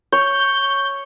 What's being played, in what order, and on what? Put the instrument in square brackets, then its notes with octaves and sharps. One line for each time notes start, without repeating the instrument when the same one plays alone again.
[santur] C#5 [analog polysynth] G6